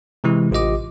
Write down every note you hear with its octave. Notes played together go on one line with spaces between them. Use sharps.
C3 E3 G#3 E4
A1 F4 G4 D#5 D6